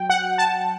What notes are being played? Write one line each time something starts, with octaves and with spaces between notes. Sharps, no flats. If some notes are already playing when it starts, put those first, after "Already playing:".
Already playing: F#3 G5
F#5
A5